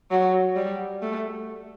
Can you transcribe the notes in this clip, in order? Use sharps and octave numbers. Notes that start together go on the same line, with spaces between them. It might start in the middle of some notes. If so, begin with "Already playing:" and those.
F#3
G3
A3